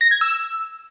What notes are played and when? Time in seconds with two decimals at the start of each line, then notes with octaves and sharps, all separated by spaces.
0.01 A#6
0.11 G#6
0.21 E6